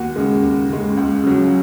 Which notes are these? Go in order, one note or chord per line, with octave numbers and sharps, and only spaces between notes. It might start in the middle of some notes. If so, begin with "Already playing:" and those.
Already playing: D#2 F#4
C#3 G#3
D#2
C#3 G#3
C#2
C#3 F#3